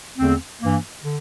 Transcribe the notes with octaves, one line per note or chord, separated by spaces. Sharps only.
E2 D3 A3 C4
G2 E3 A#3
D3